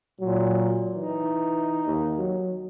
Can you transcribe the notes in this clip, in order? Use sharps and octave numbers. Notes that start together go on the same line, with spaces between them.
A#2 F#3
E3 D#4
D#2
F#3